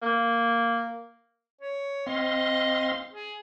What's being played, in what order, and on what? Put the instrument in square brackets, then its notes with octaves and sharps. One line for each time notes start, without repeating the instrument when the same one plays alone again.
[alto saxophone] A#3
[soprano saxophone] C#5
[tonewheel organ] C4 F5 C6 [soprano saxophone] D#5
[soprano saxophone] G#4